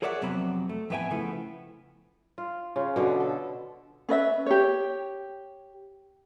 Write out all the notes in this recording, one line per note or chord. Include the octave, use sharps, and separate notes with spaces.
G#4 A#4 C#5 D5 E5 F#5
F2 C3 F#3 B3 C5 B5
A3
F2 A2 B3 E5 G5 G#5
C#3 F3 A3 B3 E4
F4
C#3 F4
B2 D3 B3
A4
C#4 B4 D#5 E5
G4 C#5